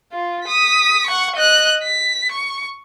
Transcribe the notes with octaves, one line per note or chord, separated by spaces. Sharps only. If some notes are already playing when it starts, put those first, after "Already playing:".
F4
D#6 B6
F#5 C#6
D#5 F#6
B6
C#6